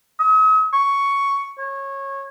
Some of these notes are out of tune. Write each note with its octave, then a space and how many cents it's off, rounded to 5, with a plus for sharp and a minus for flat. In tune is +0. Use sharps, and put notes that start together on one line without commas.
D#6 +45
C#6 +5
C#5 -20